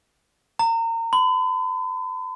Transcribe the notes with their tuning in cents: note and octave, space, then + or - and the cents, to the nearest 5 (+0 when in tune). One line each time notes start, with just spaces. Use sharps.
A#5 -30
B5 +40